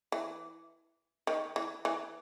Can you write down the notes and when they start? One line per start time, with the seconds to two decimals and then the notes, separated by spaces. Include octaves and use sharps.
0.12 E3
1.27 D#3
1.56 E3
1.85 E3